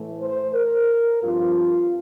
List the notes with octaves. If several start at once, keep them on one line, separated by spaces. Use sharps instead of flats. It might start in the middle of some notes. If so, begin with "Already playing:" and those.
Already playing: A2 E3 A3
C5
A#4
G2 F3 C4 F4